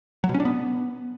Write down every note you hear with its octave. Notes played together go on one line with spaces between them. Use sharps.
F#3
B2
C#4
D4
B3